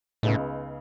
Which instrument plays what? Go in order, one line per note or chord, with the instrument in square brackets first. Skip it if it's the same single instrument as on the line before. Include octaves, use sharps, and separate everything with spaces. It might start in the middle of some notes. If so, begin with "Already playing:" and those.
[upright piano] C#2 C#3 G#3 B3 D#4 [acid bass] A2